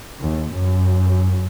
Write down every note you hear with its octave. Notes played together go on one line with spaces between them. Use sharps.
D#2
F#2